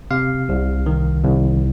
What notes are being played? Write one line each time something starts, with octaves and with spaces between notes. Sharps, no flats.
C3 F5
C2
D#3
C2